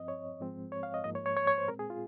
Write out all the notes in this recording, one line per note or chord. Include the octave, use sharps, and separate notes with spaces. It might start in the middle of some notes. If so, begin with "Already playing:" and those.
Already playing: G2 F3 C4 D#5
C#5
G#2 F3 G#3 C4
C#5
F5
D#5
G#2 F3 A#3 D#5
C#5
C#5
C#5
C#5
C5
A#2 G#3 C4 A#4
G#4
F4